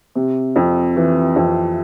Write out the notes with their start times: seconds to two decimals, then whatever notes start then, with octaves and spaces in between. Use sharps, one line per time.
0.15 C3
0.56 F2
0.97 E3
1.36 F2